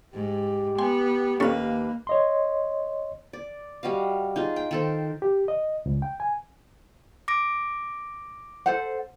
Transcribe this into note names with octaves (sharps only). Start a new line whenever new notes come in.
G#2 G4
B3 G5 G#5 C6
D#2 A#3 C#4 A4 B4 C#5
C#5 D#5 C6
D5
G3 F#4 D#5 F5
D#4 F4 G#4
G5
D#3 A4 C5
G4
D#5
C#2
G5
G#5
D6 A#6 D7
A4 C5 F#5